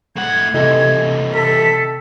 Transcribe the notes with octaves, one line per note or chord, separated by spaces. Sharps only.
A2 F#5 G#6
C3 E3 G3 A3 D#4
A4 B6